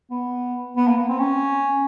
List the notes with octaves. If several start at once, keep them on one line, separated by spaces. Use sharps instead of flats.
B3
B3
A#3
B3
C4
C#4